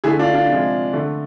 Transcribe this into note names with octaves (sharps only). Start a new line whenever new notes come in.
D3 A3 E4 G#4
D4 F4
D4 F4
C3 F3 G#3
D3 A3